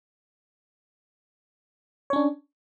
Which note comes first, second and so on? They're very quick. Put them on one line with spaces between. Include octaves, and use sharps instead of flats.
C#5 C#4 D4